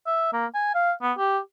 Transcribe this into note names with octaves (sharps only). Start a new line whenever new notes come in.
E5
A#3
G#5
F5
B3
G4